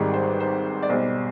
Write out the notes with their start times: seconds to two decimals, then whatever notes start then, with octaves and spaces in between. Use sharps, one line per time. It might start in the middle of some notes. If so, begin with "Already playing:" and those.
Already playing: G#1 G#2 D#3 G3
0.14 C5
0.27 B4
0.40 C5
0.83 D5
0.89 B1 B2 G3 C5